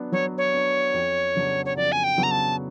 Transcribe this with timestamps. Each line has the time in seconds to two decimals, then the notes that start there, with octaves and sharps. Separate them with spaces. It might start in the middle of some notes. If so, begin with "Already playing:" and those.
Already playing: F#3 B3 D4
0.12 F#3 C#5
0.38 C#5
0.54 B3 D4
0.94 F2
1.35 C#3 F#3 B3 D4
1.65 C#5
1.76 F2 D5
1.92 G#5
2.04 G5
2.18 C#3 F#3 B3 D4
2.23 A#5
2.31 A5